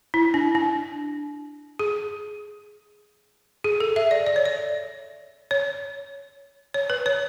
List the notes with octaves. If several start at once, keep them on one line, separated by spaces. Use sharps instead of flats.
E4
D4
D4
G#4
G#4
A4
E5
D5
D5
C#5
D5
C#5
C#5
B4
C#5